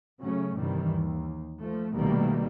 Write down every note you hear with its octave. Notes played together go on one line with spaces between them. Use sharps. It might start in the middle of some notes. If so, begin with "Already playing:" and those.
C#3 F#3 A3 C#4
C2 G2 D#3 E3 G3
D#2
F3 A3
C2 B2 D#3 G3 A3 A#3